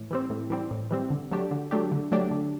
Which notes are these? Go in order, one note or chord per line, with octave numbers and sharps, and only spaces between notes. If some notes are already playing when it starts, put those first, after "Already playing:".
Already playing: A2 E3
E3 G3 C4
A2
E3 G3 C4
A2
E3 G3 C4
D3
F#3 A3 D4 G4
D3
F#3 A3 D4 G4
D3
F#3 A3 D4 G4
D3